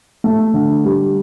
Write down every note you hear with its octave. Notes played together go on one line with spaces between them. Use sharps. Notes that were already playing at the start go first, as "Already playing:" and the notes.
A3
D3
G3